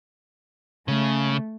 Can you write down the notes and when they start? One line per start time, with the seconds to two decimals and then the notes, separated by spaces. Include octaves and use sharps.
0.88 C#3 A3